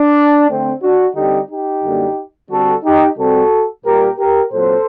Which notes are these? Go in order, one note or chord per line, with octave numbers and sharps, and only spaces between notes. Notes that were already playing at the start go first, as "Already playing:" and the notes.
Already playing: D4
D3 A3 C4
D4 F#4
D3 G3 C4 D#4 G4
D#4 G4
F#2 D3 G3 A#3
D3 G3 C4 F#4 A4
D#4 G4
C3 G3 C4 F#4 A4
A#2 G3 A#3 G4 A#4
G4 A#4
A#2 F#3 C4 A4 C5